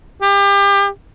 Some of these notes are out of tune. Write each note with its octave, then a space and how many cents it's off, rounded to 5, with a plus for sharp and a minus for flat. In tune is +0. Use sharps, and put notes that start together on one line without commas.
G4 +30